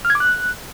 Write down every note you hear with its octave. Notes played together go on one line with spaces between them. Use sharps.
F6
G#6
D6
F#6